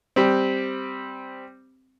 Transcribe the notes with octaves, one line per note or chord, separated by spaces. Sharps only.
G3 C4